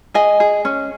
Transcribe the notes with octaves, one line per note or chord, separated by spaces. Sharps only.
G#4 D#5 G#5
G#4
C#4